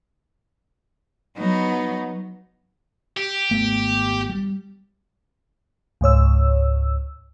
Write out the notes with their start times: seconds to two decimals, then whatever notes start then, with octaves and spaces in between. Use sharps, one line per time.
1.36 F#3 B3 D#4
3.17 G4
3.51 G#1 A3 B3
4.29 G3
6.01 C#2 G#2 C#5 E6